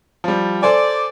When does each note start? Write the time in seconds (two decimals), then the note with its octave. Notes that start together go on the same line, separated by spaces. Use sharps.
0.24 F3 G3
0.63 A4 C5 D5 G#5